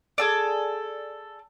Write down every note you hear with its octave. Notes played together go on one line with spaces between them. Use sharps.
G#4 A4 D5